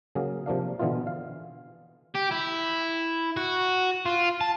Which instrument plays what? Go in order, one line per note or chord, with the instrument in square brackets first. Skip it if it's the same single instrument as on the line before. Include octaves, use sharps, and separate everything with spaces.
[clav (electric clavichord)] C#3 F#3 A#3 G#4 A#4
C3 F3 A#3 D4 F5
B2 D3 E3 B3 E4 F4
F5
[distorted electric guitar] G4
E4
F#4
F4
A5